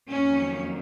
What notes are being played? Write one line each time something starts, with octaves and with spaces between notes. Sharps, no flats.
F2 D#3 F#3 A#3 C#4